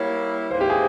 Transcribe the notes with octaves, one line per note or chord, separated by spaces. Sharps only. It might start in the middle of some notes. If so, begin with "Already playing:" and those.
Already playing: G3 A#3 E4 C#5
G#2 E3 A#3 C5
G4
G#4